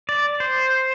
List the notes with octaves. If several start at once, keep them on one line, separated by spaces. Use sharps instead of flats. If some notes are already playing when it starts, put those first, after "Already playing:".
D5
C5